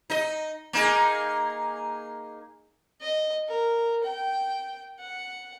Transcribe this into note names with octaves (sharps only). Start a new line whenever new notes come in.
D#4 D#5
A#3 D#4 G#4
D#5
A#4
G5
F#5